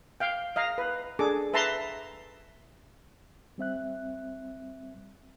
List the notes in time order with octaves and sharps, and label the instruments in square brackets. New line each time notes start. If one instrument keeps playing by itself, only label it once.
[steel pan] F5 G5
D#5 F5 A#5
B4
D4 G#4 A4 D6
B4 E5 A5 A#5 C6
[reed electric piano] G3 C4 E5 F#6